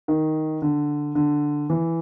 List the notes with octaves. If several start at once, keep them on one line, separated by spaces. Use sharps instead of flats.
D#3
D3
D3
E3